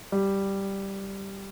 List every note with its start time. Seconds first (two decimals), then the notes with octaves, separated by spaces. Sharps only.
0.12 G3